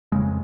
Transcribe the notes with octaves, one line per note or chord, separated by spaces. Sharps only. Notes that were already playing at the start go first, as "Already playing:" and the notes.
F2 C#3 G#3